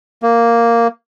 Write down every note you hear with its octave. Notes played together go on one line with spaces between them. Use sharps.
A#3